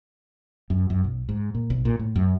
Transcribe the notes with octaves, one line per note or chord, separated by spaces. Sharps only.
F#2
F#2
B1
G#2
A#2
B1
A#2
A2
F#2